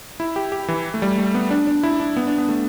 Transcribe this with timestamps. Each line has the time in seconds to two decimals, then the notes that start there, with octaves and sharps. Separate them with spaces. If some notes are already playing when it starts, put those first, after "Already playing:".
0.20 E4
0.36 G4
0.52 G4
0.68 E3
0.94 A3
1.02 G3
1.18 A3
1.34 B3
1.51 D4
1.67 D4
1.83 E4
2.00 D4
2.17 B3
2.27 D4
2.38 B3
2.49 A3